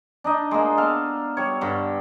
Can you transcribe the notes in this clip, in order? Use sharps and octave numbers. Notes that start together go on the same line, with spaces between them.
D4 D#4 D#5
G#3 A#3
B3 A4 F5
G3 C#5
G2 D3